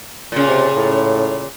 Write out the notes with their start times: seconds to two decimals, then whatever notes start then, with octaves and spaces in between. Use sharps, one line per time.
0.32 A#2 C#3
0.48 C3
0.76 A2